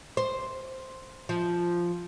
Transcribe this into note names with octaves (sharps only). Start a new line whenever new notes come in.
C5
F3